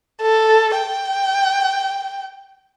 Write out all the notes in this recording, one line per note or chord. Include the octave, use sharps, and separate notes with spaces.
A4
G5